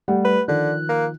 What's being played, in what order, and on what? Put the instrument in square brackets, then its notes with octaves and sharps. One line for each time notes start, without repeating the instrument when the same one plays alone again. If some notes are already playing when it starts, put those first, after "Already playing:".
[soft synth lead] G3 [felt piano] A3 G4 F#5
[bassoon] B4
[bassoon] D3 [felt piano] D#3 F3 [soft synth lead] F#6
[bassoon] A#3